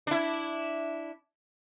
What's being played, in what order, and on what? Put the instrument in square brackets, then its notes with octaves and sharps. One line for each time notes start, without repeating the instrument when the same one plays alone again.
[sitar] D4 E4